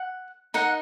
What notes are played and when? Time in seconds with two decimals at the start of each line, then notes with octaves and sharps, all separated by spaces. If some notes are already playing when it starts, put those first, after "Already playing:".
Already playing: F#5
0.54 D#4 A#4 D#5 F#5